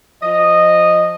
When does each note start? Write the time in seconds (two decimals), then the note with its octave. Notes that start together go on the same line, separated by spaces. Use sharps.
0.22 F3 D#5